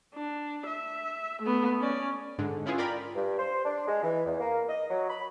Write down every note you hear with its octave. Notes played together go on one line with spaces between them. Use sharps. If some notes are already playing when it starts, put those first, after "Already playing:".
D4
E5
A3 B3
C#4 D5
G#2 D3 G#3
C#4 E4 F4 G#4 B4
F4 A#4 D5 G5 B5
G2
C5
D4
G#3
E3
E2
A#3
D#5
F#3
B5